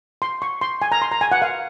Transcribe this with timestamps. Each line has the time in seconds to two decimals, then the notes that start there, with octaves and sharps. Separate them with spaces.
0.22 C6
0.42 C#6
0.61 C6
0.82 G#5
0.92 A#5
1.02 C6
1.11 A#5
1.21 G#5
1.32 F#5
1.42 F5